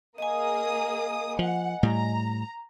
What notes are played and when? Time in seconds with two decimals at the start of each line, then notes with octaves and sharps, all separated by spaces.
0.18 A#3 G#4 D#5 G#5 D#6
1.39 F3 F#5
1.83 A2 G3 A#5